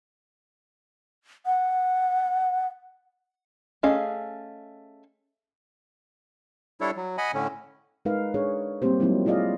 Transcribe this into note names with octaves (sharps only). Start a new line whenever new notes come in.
F#5
A3 C#4 G#4 D#5 F5
G3 D4 E4 A4 C#5
F#3
D#5 F#5 G#5 B5
A2 D3 C#4
G#3 D#4 A#4 B4 F5
D4 G#4 C#5
G3 A#3 C4 G4 C5
F#3 G#3 A#3 C4 D#4 E4
E4 F4 G#4 D5 D#5 F5